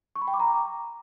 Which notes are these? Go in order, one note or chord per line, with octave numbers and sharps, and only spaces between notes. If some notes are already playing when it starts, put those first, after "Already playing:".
C#6
B5
G5
D6
A#5